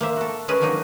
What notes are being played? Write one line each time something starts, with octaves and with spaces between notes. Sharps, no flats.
A#3 C5 E5
F#4 A4
G#3 C#4 G#4 A#4 B4
F3 F#3 A#3 D#4 G#4